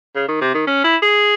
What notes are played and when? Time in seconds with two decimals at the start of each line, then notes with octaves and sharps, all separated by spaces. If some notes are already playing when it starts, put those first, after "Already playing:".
0.15 C#3
0.28 D#3
0.41 C3
0.54 D#3
0.67 C#4
0.84 E4
1.02 G#4